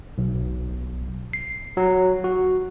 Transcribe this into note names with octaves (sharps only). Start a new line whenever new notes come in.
B1
C7
F#3
F#4